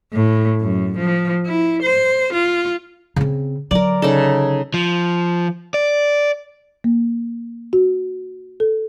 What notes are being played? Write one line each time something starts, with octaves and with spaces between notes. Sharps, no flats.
A2
F#2
F3
E4
C5
F4
C#3 C4
D3 F#3 A#4 D5
C#3 D#4 A4
F3
D5
A#3
F#4
A4